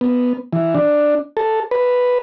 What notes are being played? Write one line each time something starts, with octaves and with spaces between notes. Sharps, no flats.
B3
E3
D4
A4
B4